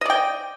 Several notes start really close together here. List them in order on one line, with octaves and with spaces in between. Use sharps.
D#5 D5 G5